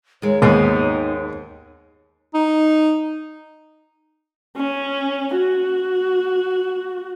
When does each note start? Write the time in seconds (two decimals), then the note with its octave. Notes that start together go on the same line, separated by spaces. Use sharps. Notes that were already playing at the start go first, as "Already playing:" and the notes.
0.22 D#2 G#3 C#5
0.42 D#2 G#2 B3 D#4
2.34 D#4
4.57 C#4
5.36 F#4